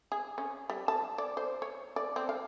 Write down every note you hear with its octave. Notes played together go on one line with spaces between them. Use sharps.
G#4
C#4
G3
A5
D5
C5
C#5
D5
C4
F5